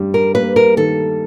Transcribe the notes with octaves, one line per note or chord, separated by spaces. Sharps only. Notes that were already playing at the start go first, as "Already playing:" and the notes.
Already playing: G2 G3
A#4
A#3 B4
A#4
D#3 A4